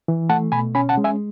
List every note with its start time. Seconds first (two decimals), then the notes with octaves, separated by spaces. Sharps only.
0.08 E3
0.30 A3 F#5 A5
0.52 B2 G#5 B5
0.75 C#4 G#5 B5
0.89 F#5 A5
0.97 G#3
1.04 E5 G#5